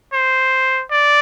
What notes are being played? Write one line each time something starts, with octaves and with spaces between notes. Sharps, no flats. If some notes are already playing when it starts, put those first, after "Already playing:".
C5
D5